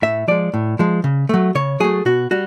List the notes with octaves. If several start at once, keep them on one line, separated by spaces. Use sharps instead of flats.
A2 E5
F3 G#3 D5
A2
F3 G#3
C#3
F#3 A3
C#3 C#5
F#3 A3 G#4
B2 F#4
G3 F#4